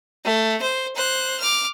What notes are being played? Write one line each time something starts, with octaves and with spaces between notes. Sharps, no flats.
A3
C5
C5 F#6
D6 F6